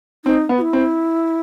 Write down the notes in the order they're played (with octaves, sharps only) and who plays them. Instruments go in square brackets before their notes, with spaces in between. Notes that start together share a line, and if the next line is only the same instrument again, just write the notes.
[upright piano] C4 [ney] D#4
[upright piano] B3
[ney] F#4
E4
[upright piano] C4